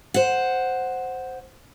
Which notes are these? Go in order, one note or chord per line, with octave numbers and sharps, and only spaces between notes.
C5 F#5